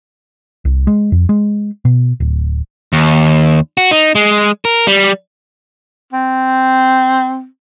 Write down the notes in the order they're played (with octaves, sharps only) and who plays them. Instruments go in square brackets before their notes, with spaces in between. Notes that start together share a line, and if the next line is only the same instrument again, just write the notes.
[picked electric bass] C2
G#3
F2
G#3
B2
D1
[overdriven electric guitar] D#2
F#4
D#4
G#3
A#4
G3
[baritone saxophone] C4